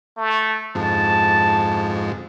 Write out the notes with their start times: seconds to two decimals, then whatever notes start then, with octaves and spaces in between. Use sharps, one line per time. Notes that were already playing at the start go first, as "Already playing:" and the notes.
0.17 A3
0.75 F2 G#2 A5